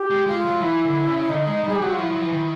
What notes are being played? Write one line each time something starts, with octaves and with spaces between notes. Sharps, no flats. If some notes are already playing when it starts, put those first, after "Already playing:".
Already playing: G4
G#3
G#3 F4
F#3
E3 E4
D3
C#3
D3 D#4
G#3
G3
G#4
G4
F#3 F#4
F4
F3 E4
F#3
F3
E3
D#3